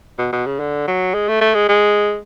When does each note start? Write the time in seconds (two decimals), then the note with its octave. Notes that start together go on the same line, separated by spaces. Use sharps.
0.19 B2
0.33 B2
0.46 C#3
0.60 D3
0.88 F#3
1.14 G#3
1.28 A3
1.41 A3
1.55 G#3
1.69 G#3